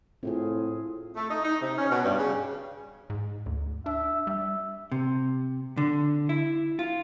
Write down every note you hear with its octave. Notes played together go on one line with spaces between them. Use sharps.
A2 C4 F4 G#4
A3
D#4
D#4
C3
C#4
B2
G2
C#3
G#2
D2
D4 E5
G3 E5
C3
D3
E4
F4